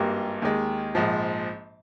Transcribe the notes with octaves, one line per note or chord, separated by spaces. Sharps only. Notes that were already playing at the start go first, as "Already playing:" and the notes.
Already playing: G#1 G2 G3 A#3
D#2 D#3 G#3
A#1 G#2 F3